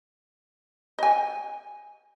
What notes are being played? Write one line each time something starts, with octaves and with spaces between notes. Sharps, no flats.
D#5 G#5